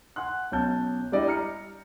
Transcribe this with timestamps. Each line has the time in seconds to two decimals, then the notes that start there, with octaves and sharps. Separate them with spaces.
0.16 F#5 G#5 C6 F#6
0.52 B1 C#4 A5 G6
1.12 G3 D4 E4 G4 D5 D#5
1.27 A#5 F6 C#7